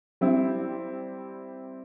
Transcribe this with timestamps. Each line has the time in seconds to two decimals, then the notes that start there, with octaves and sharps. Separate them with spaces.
0.21 G3 C4 E4